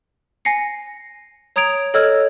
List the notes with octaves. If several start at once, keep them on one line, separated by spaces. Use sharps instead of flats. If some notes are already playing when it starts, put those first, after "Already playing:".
G#5 A#6 C7 C#7
C#5 A#5 D#6 G#6 D7 F7
A4 C#5 D#5 E6 F6 G#6